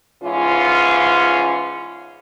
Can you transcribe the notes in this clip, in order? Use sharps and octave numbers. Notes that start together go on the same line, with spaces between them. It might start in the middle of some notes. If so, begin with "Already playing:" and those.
G#2 E3 G#3 C#4 F4